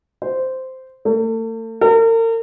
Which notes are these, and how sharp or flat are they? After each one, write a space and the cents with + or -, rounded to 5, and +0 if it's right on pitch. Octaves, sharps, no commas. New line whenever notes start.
C5 -10
A3 +40
A#4 -40